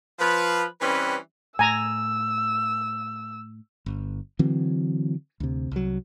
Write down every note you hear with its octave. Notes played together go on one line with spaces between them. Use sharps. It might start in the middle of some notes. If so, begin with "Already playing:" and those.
F3 B4
E3 G3 C4 C#4 B4
A2 G#5 A#5 E6
G1
D3 E3 F#3 C4
D2 C3
C2 F#3